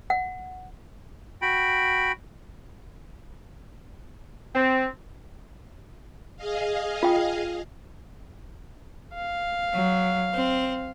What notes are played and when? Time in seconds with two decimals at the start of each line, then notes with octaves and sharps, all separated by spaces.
0.10 F#5
1.42 F#4 G5 B5
4.55 C4
6.36 G#4 D#5 F5
7.03 F4 G5
9.15 F5
9.74 F#3
10.33 C4